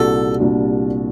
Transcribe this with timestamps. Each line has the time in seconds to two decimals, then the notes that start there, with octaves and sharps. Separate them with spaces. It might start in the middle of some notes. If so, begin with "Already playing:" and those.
Already playing: C2 A#2 G3 D4 F#4 A4
0.39 C2 A#2 G3 D4 F#4